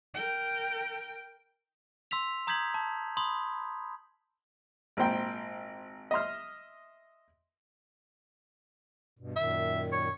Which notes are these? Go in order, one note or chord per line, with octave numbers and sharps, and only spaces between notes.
A#4 G5
C6 E6 B6 F7
A#5 D#6 G6 G#6 B6 F#7
A5
B5 C6 D#6
G#1 A#2 C5 G5
D#5 E5 C6 F6
G2 B2
F#2 A#2 D#3 E5
C#5